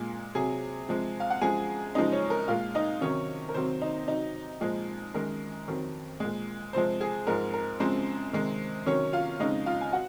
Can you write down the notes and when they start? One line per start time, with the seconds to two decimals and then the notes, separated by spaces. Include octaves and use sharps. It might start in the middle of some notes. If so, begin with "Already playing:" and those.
Already playing: A#2 G#3 G#5
0.35 C3 F#3 G#4 G#5
0.89 C3 F3 G#3
1.20 F5
1.30 F#5
1.41 F#2 F3 G#3 G#4 G#5
1.95 F#2 C#3 F3 G#3 D#4 D#5
2.12 C#4 C#5
2.30 A#4
2.48 A#2 G#3 F4 F5
2.75 D#4 D#5
3.01 C3 D#3 F#3 C#4 C#5
3.49 A#4
3.54 C3 D#3 F#3 C4 C5
3.82 D#4 D#5
4.07 C3 F#3 D#4 D#5
4.61 A#2 F3 G#3
5.14 F#2 D#3 G#3 A#4
5.68 F2 D#3 F#3
6.20 A#2 G#3
6.73 C3 F3 G#3 C4 C5
7.01 G#4
7.27 G#2 F3 G#3 A#4
7.54 A#4
7.80 F#2 C#3 F3 G#3 C4 C5
8.33 C3 D#3 G#3
8.86 C3 D#3 F#3 C#4 C#5
9.13 F4 F5
9.40 F2 C#3 G#3 D#4 D#5
9.66 F4 F5
9.81 G#5
9.93 F#4 F#5